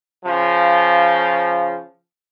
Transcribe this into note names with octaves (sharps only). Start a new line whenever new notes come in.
C#3 F3